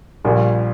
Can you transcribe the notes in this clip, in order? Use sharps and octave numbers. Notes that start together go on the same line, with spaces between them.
A#1 A#2 G3